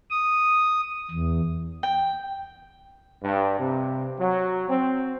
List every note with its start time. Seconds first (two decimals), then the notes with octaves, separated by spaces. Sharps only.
0.11 D#6
1.10 E2
1.83 G5
3.23 G2
3.59 C3
4.19 F#3
4.69 C4